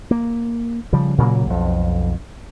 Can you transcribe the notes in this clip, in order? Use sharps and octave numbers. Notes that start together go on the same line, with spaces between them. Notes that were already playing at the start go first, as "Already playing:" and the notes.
A#3
C#3 F3 G3
A#2 C#3 F#3 A#3
B1 F2